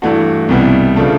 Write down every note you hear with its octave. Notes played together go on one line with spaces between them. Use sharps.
G2 E3 A3 D4 F#4
C2 B2 G3 B3 E4
C#3 F3 A3 D4